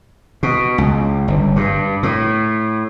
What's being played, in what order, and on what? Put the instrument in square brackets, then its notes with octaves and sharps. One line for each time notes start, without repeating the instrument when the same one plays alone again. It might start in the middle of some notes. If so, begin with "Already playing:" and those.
[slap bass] B2
C#2
G1
G2
A2